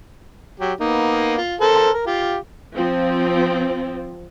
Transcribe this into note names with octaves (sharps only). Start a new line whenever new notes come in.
F#3 G4
A#3 B3 D#4
F4
A4 A#4 C5
A#4
F4 G4
F3 C4